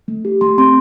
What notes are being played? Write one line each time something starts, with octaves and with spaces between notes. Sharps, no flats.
A3
G4
A3 C6
C4 C6